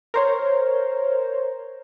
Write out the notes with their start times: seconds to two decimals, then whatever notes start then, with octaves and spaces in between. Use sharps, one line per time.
0.14 A#4 C5 C#5